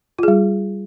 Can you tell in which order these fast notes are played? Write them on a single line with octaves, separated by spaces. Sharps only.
F4 G#4 G3